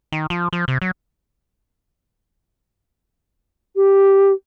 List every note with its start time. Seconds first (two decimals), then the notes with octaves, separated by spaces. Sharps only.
0.12 D#3
0.30 F3
0.53 F3
0.68 C3
0.82 F#3
3.76 G4